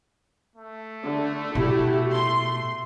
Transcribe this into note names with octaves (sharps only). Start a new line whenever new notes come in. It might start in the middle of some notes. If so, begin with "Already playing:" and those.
A3
D3
B2 E4 F#4 G4
C6